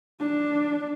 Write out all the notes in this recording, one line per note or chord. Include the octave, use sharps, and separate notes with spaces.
D4